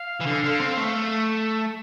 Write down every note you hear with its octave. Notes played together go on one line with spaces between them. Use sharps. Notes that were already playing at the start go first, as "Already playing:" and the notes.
Already playing: F5
E3
D3
D3
C4
A3